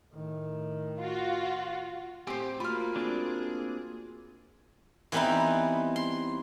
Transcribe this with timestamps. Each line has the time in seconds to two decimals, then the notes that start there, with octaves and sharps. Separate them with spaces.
0.14 A2 D#3
1.00 F4 F#4
2.27 A2 C4 G4 C5 G5 G#5
2.60 A3 A#3 F4 F#4 B5 F6
2.96 A#3 C4 D4 G#4
5.12 E3 G3 B3 C4 D#4 E4
5.96 C6